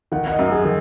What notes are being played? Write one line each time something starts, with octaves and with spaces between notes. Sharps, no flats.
D#3 F#5
F#5
D#5
F#2
G#4
D#3